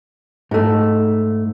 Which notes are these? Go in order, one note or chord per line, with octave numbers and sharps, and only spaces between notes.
G#2 A3